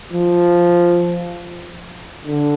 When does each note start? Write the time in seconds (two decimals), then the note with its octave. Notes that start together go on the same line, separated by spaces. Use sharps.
0.13 F3
2.25 D3